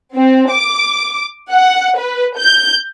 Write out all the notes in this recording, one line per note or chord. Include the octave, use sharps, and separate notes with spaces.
C4
D6
F#5
B4
G6